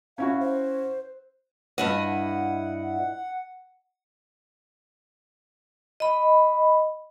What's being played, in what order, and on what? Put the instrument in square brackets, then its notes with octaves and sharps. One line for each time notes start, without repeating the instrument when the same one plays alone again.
[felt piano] C#4 E4 F#4 [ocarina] F5
[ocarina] C5
[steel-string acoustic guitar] G2 E4 D#5 [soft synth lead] F#5
[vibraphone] D#5 B5